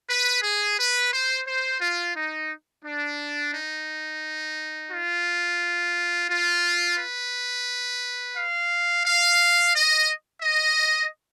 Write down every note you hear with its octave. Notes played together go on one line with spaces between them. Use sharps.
B4
G#4
B4
C5
C5
F4
D#4
D4
D#4
F4
F4
B4
F5
F5
D#5
D#5